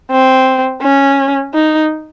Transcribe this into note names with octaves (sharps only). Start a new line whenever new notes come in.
C4
C#4
D#4